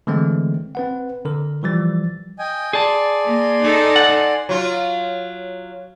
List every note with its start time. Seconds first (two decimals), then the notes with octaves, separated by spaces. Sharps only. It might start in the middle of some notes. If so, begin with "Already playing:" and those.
0.07 D3 E3 G#3 A3 C4
0.75 C4 B4 F#5
1.25 D3 A#4
1.63 E3 F3 G3 A6
2.39 D#5 G5 G#5
2.73 G#4 D5 G#5 A5 C6
3.26 A#3
3.63 D#4 A4
3.96 F#5
4.49 F#3 F4